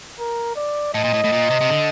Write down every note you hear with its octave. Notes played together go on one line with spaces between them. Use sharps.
A#4
D5
A2 D#5
A#2
A2
A2
A#2
C3
C3
D3